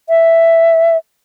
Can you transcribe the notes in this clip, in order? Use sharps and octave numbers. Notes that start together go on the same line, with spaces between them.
E5